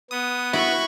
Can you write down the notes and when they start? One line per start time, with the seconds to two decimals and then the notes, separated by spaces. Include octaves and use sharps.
0.11 B3 D#6
0.53 E4 F#4 B5 C#6